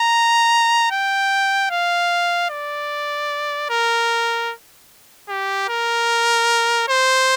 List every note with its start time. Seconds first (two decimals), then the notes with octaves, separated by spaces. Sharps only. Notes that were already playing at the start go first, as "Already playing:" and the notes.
Already playing: A#5
0.91 G5
1.71 F5
2.50 D5
3.69 A#4
5.29 G4
5.68 A#4
6.88 C5